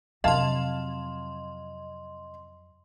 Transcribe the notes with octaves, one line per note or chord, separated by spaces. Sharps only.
F2 C3 F#3 C4 D#5 F5 A5 C6